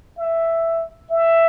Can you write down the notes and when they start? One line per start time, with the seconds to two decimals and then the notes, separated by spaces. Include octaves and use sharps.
0.18 E5
1.11 E5